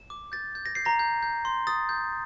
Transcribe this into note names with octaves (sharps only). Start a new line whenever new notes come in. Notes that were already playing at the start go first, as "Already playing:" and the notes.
Already playing: A5
D6
G6 A6
G6
A#6
G6 C7
A#5 A#6
G6
G6
C6
D#6 A6
G6